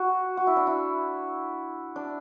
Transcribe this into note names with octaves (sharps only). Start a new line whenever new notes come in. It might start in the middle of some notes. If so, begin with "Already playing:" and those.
Already playing: F#4
F#4
E4
D4
E4
D4